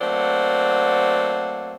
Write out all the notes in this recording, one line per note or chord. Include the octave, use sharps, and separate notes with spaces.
F#3 A3 A#3 C4 D5 F#5